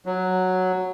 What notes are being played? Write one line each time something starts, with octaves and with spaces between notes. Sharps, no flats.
F#3